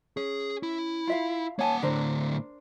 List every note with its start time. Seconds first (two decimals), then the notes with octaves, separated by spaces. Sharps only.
0.17 C#4 G#4
0.63 E4
1.07 F4 E5 F5
1.59 A#3 C#5 F#5 G#5 A5
1.83 A2 D3 D4 A#4 C5